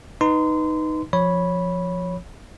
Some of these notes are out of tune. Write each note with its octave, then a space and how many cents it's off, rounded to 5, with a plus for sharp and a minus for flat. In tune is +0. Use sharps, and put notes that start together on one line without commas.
D#4 +0 B4 +0 C6 -25
F3 +0 C#5 +0 B5 -10